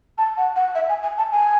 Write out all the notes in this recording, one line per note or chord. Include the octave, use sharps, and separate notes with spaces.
A5
F#5
F#5
E5
G#5
G#5
A5
G#5